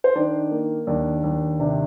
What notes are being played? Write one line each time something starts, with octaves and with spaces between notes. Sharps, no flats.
C5
D#3 D4 D5
A#3
D#2 D4 D5
D#2
C3 D4 D5